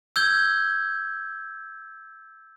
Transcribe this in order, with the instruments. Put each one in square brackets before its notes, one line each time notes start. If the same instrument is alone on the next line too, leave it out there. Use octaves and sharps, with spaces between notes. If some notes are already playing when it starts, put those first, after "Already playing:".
[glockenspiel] E6 G6 G#6 G7